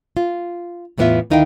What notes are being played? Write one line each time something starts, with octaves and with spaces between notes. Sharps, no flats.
F4
E2 A2 E3 B3 F4 E5
D2 D#3 D#4 E4 F5 G5